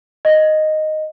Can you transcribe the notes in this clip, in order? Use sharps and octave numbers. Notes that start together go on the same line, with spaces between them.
D#5